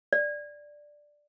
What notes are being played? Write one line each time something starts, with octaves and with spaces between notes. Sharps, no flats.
D5